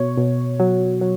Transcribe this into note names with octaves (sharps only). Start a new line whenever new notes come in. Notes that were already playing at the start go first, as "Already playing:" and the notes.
Already playing: B2 C#5
B2
F#3
F#3